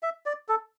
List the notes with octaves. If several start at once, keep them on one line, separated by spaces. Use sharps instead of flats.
E5
D5
A4